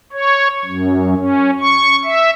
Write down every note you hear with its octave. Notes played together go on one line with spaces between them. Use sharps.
C#5
F#2
C#4
C#6
E5